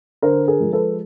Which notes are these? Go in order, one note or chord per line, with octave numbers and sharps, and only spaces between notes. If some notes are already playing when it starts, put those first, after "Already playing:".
D3 A#4 C5
G#4 A#4
F3 G#3
A4 B4